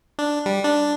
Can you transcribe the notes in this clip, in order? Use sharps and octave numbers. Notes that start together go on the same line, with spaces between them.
D4
G3
D4